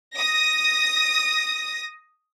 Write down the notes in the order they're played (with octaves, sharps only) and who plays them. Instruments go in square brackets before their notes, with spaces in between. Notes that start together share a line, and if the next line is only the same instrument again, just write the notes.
[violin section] D#6 A#6